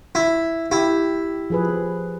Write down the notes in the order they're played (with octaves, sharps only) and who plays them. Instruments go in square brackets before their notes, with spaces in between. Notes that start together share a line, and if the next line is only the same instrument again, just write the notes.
[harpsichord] E4
[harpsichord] E4 [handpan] G4
[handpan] F3 G#4 B4